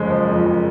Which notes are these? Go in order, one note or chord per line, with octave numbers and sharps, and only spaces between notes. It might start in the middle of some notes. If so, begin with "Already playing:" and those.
Already playing: F#1 F2 F3 G#3
F3
F2
F#1